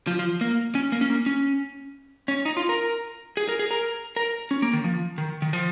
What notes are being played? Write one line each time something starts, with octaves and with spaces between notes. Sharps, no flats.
F3
F3
A#3
C#4
A#3
C#4
A#3
C#4
C#4
D#4
F4
A#4
G#4
A#4
G#4
A#4
A#4
C#4
A#3
D#3
F3
D#3
D#3
F3